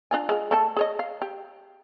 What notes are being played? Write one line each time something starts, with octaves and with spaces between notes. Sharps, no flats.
D4 F4 G#5
G#3 F4
A3 A4 A5
G#4 C#5 D#5
F5
G4